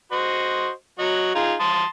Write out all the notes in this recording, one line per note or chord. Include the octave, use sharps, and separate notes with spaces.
F#4 C5 D#5
F#3 F#4 D#5
D#4 F4 G#4
A5 C6 D#6